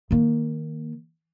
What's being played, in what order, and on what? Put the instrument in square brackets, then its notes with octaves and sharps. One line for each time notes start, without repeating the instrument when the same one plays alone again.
[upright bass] D#3 A#3